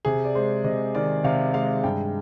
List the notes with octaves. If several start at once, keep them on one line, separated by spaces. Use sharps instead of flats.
C3 G#4
D5
G#3 C5
C3 D#5
D#3 D5
C3 F5
G#3 F5
G2 G5